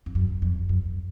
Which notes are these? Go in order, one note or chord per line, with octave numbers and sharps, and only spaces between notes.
F2
F#2
F2
F#2